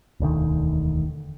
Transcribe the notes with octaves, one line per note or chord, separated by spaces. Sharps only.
E1 D2 D3 D#3